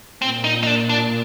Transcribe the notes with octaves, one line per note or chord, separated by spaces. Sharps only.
A#2 C4
D#4
D#4
D4
D4